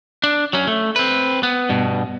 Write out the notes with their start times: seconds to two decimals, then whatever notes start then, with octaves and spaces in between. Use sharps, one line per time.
0.24 D4
0.53 F#3 C#4
0.67 A3
0.96 C4 B4
1.43 B3
1.69 G2 B2